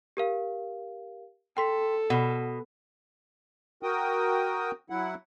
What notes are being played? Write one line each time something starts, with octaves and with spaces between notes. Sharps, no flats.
G4 A#4 F5
A4 G5 C6 B6
B2 F#5
F#4 A#4 G5 D#6
F#3 E4 F#5